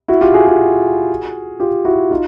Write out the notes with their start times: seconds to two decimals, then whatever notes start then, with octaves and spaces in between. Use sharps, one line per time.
0.08 E4 F#4
0.21 F4 G4
0.34 F#4 G#4
0.46 F#4 G#4
1.60 F4 G4
1.85 E4 F#4
2.11 D#4 F4